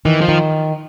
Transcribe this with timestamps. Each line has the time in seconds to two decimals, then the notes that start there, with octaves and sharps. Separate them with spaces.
0.05 D#3 E3
0.21 F3
0.29 D#3